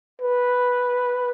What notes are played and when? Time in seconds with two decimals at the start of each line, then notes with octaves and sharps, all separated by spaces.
0.21 B4